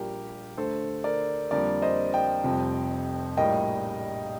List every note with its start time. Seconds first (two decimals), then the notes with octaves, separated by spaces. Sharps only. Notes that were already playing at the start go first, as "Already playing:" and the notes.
Already playing: A#1 A#2 G3 G4 A#4
0.57 D2 D3 A3 A4 C5
1.04 A#4 D5
1.51 F2 D3 G3 A#3 A#4 D5
1.82 C5 D#5
2.14 D#5 G5
2.44 F1 F2 C3 G3
3.37 A#1 A2 G3 A#3 D#5 G5